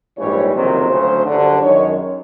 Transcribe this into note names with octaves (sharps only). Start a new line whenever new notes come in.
A#1 G#2 E3 G3 C#5
F#1 F2 C3 D#3 F#3 C5
D2 C#3 F#3
G1 F#2 D3
F#2 D#3 G#3 C#5